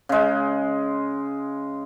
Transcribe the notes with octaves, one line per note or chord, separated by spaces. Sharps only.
C#3 G#3